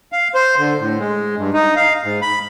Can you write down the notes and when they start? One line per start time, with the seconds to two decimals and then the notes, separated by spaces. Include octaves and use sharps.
0.12 F5
0.34 C5
0.58 D3
0.80 A2
1.00 G#3
1.37 G2
1.53 D#4
1.76 F5
2.04 G#2
2.22 B5